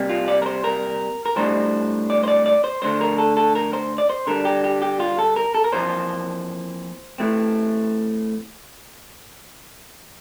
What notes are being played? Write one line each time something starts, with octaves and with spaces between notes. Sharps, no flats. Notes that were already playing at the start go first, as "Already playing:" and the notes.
Already playing: C3 G3 A#3
F4
D5
A#4
C5
A#4
A#4
A2 G3 D4 C5
D5
C5
D5
D5
C5
D3 A3 D4 C5
A#4
A4
A4
A#4
C5
D5
C5
D3 G3 D4 A#4
G4
G4
G4
F4
A4
A#4
A4
A#4
F2 E3 A#3 C5
A2 E3 A3 C4